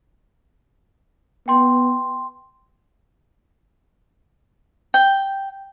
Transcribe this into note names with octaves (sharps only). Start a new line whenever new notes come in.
B3 G5 C6
G5